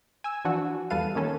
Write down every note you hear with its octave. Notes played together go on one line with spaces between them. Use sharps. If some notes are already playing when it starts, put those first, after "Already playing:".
G#5 E6
E3 F3 D4 F#4
E2 G3 A4 B4 F5 D#7
D#3 A#3 C#4 A4